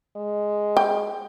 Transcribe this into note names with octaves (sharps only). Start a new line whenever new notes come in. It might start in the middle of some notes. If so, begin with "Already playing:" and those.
G#3
G5